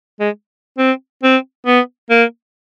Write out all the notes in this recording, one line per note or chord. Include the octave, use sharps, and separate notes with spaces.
G#3
C4
C4
B3
A#3